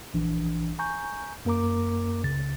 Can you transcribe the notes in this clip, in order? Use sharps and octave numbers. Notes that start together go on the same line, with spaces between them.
A#1 E3 D4
G#5 A#5 C#6 G6
F#2 A#3 A#4 A#5 D6
C#2 C#3 A6